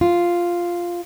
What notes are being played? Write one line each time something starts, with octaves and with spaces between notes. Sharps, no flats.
F4